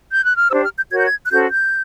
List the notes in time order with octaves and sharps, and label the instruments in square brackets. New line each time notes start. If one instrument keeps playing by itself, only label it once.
[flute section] G6
F#6
F6
D4 G4 C5 E6
F6
G6
F#4 A#4 C#5 G#6
G6
G#6
F#6
C#4 F#4 A4 C5 G6
G6